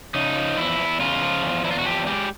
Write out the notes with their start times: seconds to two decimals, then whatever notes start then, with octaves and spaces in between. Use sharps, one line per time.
0.15 C#3 D#4
0.36 F3
0.57 E2 E4
0.79 E2
1.00 C#3 F4
1.22 F3
1.43 E2
1.64 E2 E4
1.71 F4
1.79 F#4
1.85 F3 G4
2.07 G#3 G4